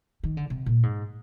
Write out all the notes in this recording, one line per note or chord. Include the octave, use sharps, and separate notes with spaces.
D#3
D3
C3
A#2
G#2